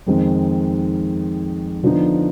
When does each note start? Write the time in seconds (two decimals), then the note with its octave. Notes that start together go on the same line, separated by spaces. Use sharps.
0.07 F2 D#3 G#3 C4
1.83 D3 F3 B3 D#4